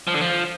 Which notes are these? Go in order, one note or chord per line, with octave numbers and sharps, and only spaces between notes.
F3
D3
F3